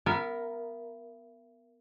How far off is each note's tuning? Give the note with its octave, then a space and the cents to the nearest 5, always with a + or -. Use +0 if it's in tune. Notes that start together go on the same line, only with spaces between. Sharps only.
B3 +0 A#4 +0 E5 +40